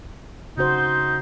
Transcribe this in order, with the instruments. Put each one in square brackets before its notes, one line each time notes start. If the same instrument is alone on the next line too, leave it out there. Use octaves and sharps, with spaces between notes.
[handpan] C#3 F#4 C5 [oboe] D#4